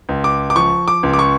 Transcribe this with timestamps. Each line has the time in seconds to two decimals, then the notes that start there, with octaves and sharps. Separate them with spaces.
0.09 C#2
0.24 D6
0.50 D6
0.56 F3 C#6
0.88 D6
1.03 C#2
1.13 D6
1.19 C#6